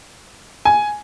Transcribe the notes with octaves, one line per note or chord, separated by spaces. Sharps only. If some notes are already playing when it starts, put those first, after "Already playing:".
G#5